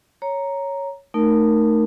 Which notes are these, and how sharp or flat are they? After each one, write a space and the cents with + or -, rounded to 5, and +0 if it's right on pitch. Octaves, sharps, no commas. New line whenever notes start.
C#5 +0 A#5 +0
A3 +5 D#4 -20 A#4 +0